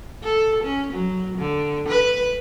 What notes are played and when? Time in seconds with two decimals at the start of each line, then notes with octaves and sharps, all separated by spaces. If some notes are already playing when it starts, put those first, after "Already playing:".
0.24 A4
0.64 C#4
0.94 F#3
1.38 D3
1.89 B4